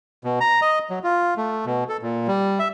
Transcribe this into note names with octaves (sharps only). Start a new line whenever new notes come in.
B2
A#5
D#5
F#3
F4
A3
B2
A4
A#2
G3
E5